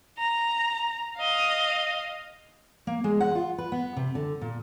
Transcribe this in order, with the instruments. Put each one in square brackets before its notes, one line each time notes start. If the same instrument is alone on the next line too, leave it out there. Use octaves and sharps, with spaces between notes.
[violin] A#5
D#5 F5
[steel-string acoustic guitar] A#3
G#3
F#5
F4
B4
B3
C3
D3
A#2